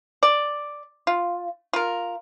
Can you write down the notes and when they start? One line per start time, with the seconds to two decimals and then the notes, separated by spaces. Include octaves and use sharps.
0.23 D5
1.07 F4
1.73 F4 A#4